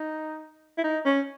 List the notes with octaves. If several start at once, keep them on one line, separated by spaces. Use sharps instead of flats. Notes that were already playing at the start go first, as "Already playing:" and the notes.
Already playing: D#4
E4
D#4
C#4